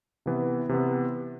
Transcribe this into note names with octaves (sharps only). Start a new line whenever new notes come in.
C3 E3 B3
C3 E3 B3